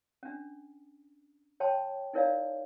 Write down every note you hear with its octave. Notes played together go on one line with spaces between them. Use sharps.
C#4 D4
C#5 G5 A5 C6
D#4 E4 A#4 C#5 D5 F5